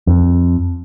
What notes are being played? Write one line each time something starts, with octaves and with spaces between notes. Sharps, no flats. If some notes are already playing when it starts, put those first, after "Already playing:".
F2